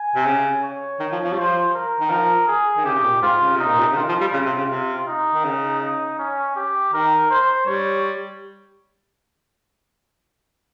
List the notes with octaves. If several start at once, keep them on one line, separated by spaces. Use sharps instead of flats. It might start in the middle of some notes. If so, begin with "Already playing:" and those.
Already playing: G#5
C3
C#3
C#5
D#3
F3
F3
G3
F3 C5
A#4
D#3
F3 A#4
G#4
D#3
C#3 G4
C3
A#2
G#2 F4
C#3
C3
D#4
A#2
C3
C#3
D#3 F4
F3
G3
C#3
C3
C#3
C3
D#4
D#3
C#3
D#4
C#4
G4
D#3 A#4
C5
G3 C#5